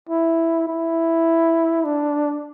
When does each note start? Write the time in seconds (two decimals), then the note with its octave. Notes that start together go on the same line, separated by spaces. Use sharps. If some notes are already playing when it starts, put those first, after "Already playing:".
0.09 E4
0.67 E4
1.84 D4